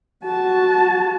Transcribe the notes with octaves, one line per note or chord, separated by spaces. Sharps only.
F#4 A5